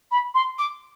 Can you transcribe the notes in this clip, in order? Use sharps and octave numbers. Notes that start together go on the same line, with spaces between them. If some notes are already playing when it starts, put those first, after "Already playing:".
B5
C6
D6